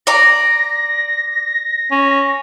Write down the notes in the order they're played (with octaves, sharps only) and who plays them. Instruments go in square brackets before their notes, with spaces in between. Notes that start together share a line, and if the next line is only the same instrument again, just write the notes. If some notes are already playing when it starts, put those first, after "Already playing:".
[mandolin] D5 A#5 [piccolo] A#6
[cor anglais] C#4